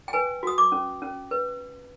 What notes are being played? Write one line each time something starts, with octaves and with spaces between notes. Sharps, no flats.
G5
B4 G#5
F#4 D#6
D6
C#4
C#4
B4